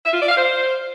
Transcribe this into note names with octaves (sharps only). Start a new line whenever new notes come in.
E5
F4
D5
F5
C5